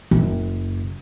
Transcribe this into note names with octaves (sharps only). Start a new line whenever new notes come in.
F#1